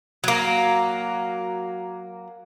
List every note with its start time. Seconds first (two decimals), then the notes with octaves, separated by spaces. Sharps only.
0.24 F#3 A#3